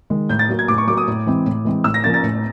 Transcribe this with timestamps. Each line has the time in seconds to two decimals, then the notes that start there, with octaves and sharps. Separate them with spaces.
0.10 D#3 G#3
0.29 A2 G6
0.39 A6
0.49 F#3 A#3
0.59 G#6
0.68 A2 D6
0.78 C#6
0.87 F#3 A#3 D6
0.97 D#6
1.07 A2
1.26 E3 G#3 C4
1.46 A2
1.65 E3 G#3 C4
1.84 A2 E6
1.94 A#6
2.03 F3 A#3 C#4 A6
2.14 A6
2.23 A2